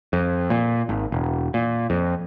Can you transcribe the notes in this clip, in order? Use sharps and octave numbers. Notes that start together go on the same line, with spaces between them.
F2
A#2
G#1
E1
A#2
F2